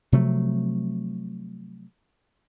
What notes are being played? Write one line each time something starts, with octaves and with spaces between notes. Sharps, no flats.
C3 F3 F#3 A3